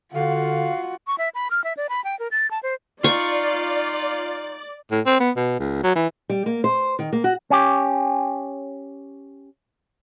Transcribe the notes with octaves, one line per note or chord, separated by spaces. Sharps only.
D3 F4 F#4 F5
C#6
E5
B5
F6
E5
D5
B5
G5
A#4
A6
A5
C5
D#4 F4 D5 C#6
A2
C4
B3
B2
C#2
F#3
E3
G3
A#3
C5
D#3
A#3
F#4
C#4 G4